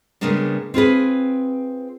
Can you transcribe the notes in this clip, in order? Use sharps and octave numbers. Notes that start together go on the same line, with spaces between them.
C#3 G3 G#3 A#3 B3 D4
C4 F4 G#4 B4